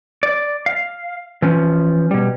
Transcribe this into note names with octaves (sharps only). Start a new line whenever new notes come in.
D5
F5
E3 F3 C#4
B2 G3